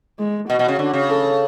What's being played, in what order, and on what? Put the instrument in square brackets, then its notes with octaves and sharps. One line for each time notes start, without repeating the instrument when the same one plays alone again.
[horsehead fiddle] G#3
[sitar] B2 [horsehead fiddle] F#4
[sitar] B2
C#3
D3
C#3
[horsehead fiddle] A4